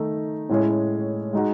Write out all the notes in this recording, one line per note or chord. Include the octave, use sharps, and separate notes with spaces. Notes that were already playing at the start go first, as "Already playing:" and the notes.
Already playing: D#3 A3 D#4
A2 G#3 C#4 E4 G#4
G#3 D#4 F#4